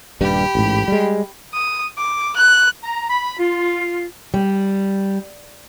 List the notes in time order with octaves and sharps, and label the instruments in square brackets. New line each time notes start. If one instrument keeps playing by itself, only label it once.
[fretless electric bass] D#1 G2 G3 [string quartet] G4 B5
[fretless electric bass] A1 G#2
G3 G#3
[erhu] D#6
D6
F#6
[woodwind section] A#5
B5
F4
[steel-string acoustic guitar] G3